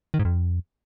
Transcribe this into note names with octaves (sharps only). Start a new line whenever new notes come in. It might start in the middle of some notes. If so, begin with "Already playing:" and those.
D#3
G#2
F2